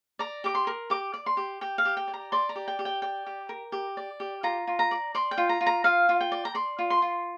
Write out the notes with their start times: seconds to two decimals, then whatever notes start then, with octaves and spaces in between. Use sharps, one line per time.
0.19 D5 A#5
0.44 G4 D6
0.55 C6
0.67 A#4
0.90 G4 D6
1.14 D5
1.26 C6
1.37 G4
1.61 G4 G5
1.78 F5
1.85 G4
1.97 G5
2.08 D5
2.14 A#5
2.32 D5 C6
2.49 A#5
2.55 G4
2.68 G5
2.79 G4
2.85 G5
3.02 D5 G5
3.26 G4
3.49 A#4
3.72 G4
3.97 D5
4.20 G4
4.43 F4 A#5
4.67 F4
4.79 A#5
4.91 D5
5.15 D5 C6
5.31 G5
5.38 F4
5.49 A#5
5.61 F4
5.67 A#5
5.84 F4 F5
6.09 F4
6.21 G5
6.32 D5
6.45 A#5
6.55 D5 C6
6.79 F4
6.90 C6
7.02 F4